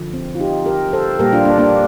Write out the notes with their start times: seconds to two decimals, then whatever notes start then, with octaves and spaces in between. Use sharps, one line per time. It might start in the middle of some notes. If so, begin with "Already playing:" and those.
Already playing: D3 F3
0.14 C4
0.35 F4
0.40 D#4 G4
0.66 G4 A#4
0.93 A4 C5
1.19 A#2 G3 A#3 G4 A#4
1.32 D4 F4
1.45 A#3 D4
1.58 A#3 D4